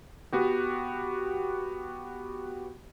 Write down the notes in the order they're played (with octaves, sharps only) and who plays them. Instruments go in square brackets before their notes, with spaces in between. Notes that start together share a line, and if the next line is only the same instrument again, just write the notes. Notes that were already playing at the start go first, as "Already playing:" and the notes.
[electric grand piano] B3 F#4 G4